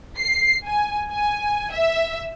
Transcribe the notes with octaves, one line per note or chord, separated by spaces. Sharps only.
C7
G#5
G#5
E5